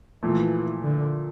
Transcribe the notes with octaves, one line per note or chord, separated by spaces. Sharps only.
A#2 E3 F3 A3
D3